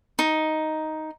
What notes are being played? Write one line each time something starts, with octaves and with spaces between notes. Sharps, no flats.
D#4